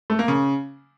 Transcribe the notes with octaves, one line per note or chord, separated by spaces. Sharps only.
A3
A#3
C#3